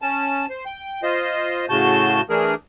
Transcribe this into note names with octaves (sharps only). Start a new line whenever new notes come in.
C#4 A5
C5
G5
F4 C5 D#5
A2 C#3 F#4 A5 G6
E3 A3 D4 G#4 A#4